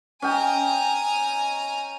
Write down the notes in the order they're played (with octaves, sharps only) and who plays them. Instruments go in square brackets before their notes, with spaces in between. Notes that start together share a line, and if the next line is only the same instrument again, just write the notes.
[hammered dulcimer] C#4 D#5 G5 [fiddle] G#5 A#5